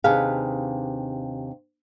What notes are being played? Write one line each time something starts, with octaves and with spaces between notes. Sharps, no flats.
D#2 C3 D4 G#4 B4 F5